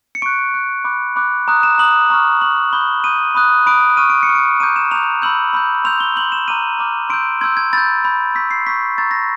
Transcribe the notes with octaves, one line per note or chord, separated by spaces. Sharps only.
C#7
C#6 F#6 D7
C#6 F#6
B5 D6 F#6
B5 D6 F#6
A#5 D#6 F#6
E7
A#5 D#6 F#6 F#7
A#5 C#6 F6
A#5 C#6 F6 F#7
B5 D#6 G6 G7
B5 D#6 G6 D#7
B5 D#6 F#6
B5 D#6 F#6 D7
C#6 F6 D#7
D7
C#7
C#6 F6
D7
A#5 D6 G6 D#7
E7
A#5 D6 G6 F7
B5 E6 G6 F#7
B5 E6 G6
C6 E6 G6 F7
G7
C6 E6 G6 F#7
E7
A#5 D6 F6 D#7
A#5 D6 F6
C6 E6 G6 D7
C6 E6 G6 G#6
G#6
B5 E6 G6 A6
B5 E6 G6
C#6 E6 G6 B6
C7
C#6 E6 G6 B6
A#5 C#6 E6 G6 A6
A#6